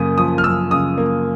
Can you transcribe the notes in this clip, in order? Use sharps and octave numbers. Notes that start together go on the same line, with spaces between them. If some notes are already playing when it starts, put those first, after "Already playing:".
Already playing: F#2 C#3 A#3 D#6
F3 D#6
F6
F#2 E6
C#3 D#6
A#3